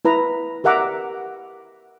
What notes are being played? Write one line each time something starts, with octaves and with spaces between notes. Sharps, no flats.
E4 B4 A#5
G4 A#4 E5 F#5 A#5 D6